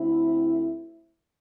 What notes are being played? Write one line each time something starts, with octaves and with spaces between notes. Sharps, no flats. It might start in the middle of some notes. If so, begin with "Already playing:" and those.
Already playing: D2 D3 A3 C4 E4